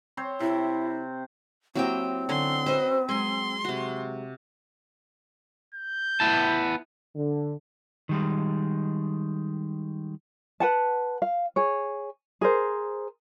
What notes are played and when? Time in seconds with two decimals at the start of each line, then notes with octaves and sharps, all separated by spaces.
0.17 C4 C5 C#5
0.40 C3 E4
1.75 F#3 A#3 C4 E4 F#4 G4 G5
2.29 F#2 D3 C#4 C6
2.66 F#4 B4 C5 D#5
3.09 F#3 G#3 C6
3.65 C3 F#4
5.74 G6
6.20 B3 E4 A5
7.15 D3
8.09 D#3 G3 G#3
10.60 B4 F#5 A5
11.22 F5
11.56 G#4 C#5
12.41 G#4 A#4 C5